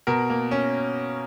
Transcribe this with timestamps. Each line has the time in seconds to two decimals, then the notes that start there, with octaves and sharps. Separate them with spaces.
0.07 B2 A#4
0.30 A#3
0.51 C#4